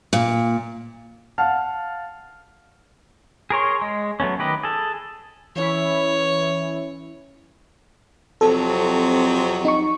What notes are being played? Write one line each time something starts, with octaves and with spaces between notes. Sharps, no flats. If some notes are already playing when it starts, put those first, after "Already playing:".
A#2
F5 F#5 A5 F6
G#4 A#4 C#5 C6
G#3
F#3 A3 B3 C#4
D#3 G4 B4 D#5
G#4 A4
E3 C#4 E4 C#5
F2 C3 F#3 A4
D#4 C#6